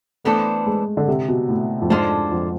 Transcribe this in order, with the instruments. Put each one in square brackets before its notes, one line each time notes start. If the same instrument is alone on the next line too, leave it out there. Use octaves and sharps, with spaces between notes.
[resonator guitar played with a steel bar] E3 B3 D4 A4 C5 [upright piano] A3
[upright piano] G#3
D3
C3
B2
A2
F2
[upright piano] G#2 [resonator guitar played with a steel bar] G#3 D4 F4 A4 C5
[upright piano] F2